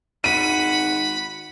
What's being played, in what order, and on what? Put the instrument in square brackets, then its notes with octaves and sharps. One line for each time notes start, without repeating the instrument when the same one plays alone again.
[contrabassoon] G#1 [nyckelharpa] F#5 [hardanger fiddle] B5 [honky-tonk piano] D#7